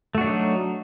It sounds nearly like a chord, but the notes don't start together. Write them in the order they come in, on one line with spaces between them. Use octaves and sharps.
A3 F#4 D4 F#3 D#4